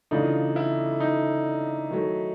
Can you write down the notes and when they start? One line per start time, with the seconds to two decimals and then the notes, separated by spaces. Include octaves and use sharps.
0.11 C#3 E3 A3 D4 D#4 F4
0.56 E4
1.00 D#4
1.91 D#3 F#3 A3